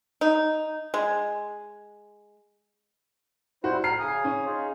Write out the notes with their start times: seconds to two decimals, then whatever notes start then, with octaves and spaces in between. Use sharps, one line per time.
0.21 D#4
0.94 G#3
3.64 G3 E4 F#4 C5
3.84 A2 A#5 F6 C7
4.00 C#3 G#5 D#6
4.25 C#4
4.46 D#4 F4 G#4